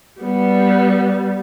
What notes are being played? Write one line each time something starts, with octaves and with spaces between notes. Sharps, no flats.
G3 B3